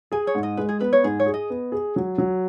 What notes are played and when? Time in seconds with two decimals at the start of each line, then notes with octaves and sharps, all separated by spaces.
0.12 G#4 G#5
0.27 C#5
0.35 G#2
0.43 D#5
0.57 G#3 B4
0.69 G#4
0.80 B3 B4
0.93 C#5
1.04 G#2 G#4
1.20 C#5
1.26 G#4
1.34 D#5
1.50 B3
1.72 G#4
1.96 F#3
2.18 F#3